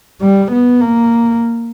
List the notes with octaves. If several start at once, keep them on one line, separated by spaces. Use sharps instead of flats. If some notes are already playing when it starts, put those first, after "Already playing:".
G3
B3
A#3